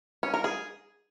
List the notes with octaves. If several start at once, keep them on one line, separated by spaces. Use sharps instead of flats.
C#4
A#4
G#4